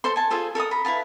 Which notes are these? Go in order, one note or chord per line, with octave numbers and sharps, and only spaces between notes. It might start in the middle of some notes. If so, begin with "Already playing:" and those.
A4 C5 C6
G#5 A5
F4 G#4 A4 C5
A4 A#4 A5 D#6
A#5 B5
E4 B4 F5 A5